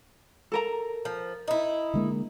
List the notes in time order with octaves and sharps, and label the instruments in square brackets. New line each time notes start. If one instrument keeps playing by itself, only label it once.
[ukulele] A4 A#4 A#5
[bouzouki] F3
D#4 E4
[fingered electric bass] D3 G#3 A#3